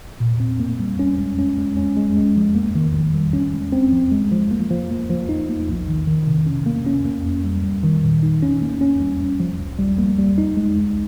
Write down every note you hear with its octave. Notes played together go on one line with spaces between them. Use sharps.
A#2
C4
A#3
G3
C#4
G#3
C#4
G#3
C#4
G#3
G#3
F3
A#3
D#3
G#1
G3
C#4
G#3
C4
F3
G#3
F3
A#3
F3
A#3
F3
D#4
A#3
A#1
D#3
D#3
C3
C#4
A#3
C#4
A#3
F2
G3
G3
D#3
A#2
D#4
C#4
A#3
C#4
G3
G#1
F3
C2
G3
A#3
G3
D#4
G#3
C#2